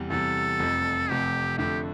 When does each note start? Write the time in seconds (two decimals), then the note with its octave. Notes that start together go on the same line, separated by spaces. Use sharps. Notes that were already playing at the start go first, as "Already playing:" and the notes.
Already playing: E2 C3 G3
0.10 E2 C3 G3 A4
0.59 F1 F2 C3
1.09 F1 F2 C3 G4
1.58 F2 D3 A3 G4